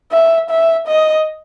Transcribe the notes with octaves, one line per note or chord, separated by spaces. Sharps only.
E5
E5
D#5